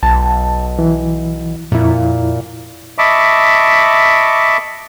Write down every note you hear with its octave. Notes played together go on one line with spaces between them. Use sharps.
B1 A5
E3
F2 A#2 E4
D#5 E5 A5 B5 C#6 D6